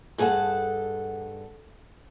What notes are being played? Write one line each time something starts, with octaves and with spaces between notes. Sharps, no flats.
G2 G#4 A4 F#5 A5